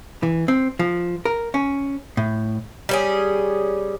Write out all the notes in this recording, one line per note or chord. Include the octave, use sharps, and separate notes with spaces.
E3
C4
F3
A#4
C#4
A2
G3 C#4 G#4